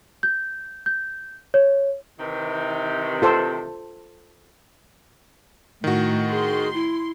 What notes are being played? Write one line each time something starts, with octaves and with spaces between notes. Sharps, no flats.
G6
G6
C#5
C3 D#3 E3
F4 A4 C5
A2 D#3 F#4
G#4 C6
E4